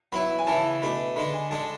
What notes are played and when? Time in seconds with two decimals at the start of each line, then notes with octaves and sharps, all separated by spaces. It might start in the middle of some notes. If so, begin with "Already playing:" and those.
0.12 F#3 B3 E4 B5
0.39 G#5
0.47 C#3 E3 B3 E4 A5
0.82 B2 A3 D4 B5
1.16 D3 G#3 D4 B5
1.33 G#5
1.51 D3 G#3 D4 A5